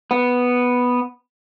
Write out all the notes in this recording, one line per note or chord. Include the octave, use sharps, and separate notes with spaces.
B3